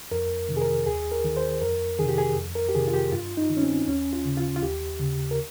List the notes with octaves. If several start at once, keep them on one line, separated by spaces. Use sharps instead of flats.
F2 A#4
C3 D#3
G#4
A#4
D#2 G#4
A#4
D#3
C5
F2 A#4
C3 D#3 G#4
G4
G#4
F2
A#4
G4
C3 D#3 G#4
F4
G4
G2 F4
D#4
D#3
C#4
C4
D#2 C#4
F4
C#3
F4
F4
D#2 G4
C#3
A#4